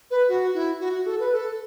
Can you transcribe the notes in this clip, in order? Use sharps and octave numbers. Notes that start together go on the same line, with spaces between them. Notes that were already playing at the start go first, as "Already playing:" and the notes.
B4
F#4
E4
F#4
F#4
A4
B4
A4